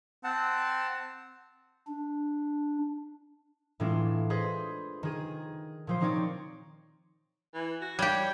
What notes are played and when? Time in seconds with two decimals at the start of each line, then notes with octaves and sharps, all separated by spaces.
0.24 C4 F#5 A5
1.88 D4
3.80 A2 E3 G#3 D4 F4
4.30 G#4 B4 C5 D#5
5.03 D#3 G#4 D#7
5.87 A#2 F3 C5
6.01 D#3 C4 D#4 C#5 D5
7.54 E3
7.81 F#4
7.99 G3 G4 C#5